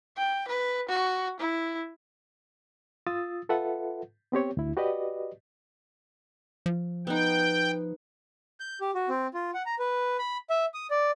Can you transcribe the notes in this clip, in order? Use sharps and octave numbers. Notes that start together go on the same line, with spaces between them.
G5
B4
F#4
E4
F4 D#6 E6 A6
F4 A4 B4 E5 F#5
B3 C4 G4 C#5
D2 E4
F#4 G4 B4 D5 D#5
F3
B3 D#4 G5
G6
G4
F#4
C4
F4
F#5
A#5
B4
B5
E5
D#6
D5